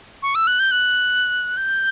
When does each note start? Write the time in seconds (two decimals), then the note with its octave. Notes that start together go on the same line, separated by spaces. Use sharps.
0.23 C#6
0.35 E6
0.47 F#6
0.59 G6
0.71 F#6
1.57 G6